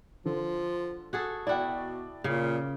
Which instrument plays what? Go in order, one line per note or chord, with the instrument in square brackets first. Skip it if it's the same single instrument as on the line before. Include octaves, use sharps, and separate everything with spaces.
[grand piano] D3 [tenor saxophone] F3
[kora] F#4 G#4 A4
[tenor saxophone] B2 [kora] E4 F#4 [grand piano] D5 G5
[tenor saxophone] A#2 [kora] C#3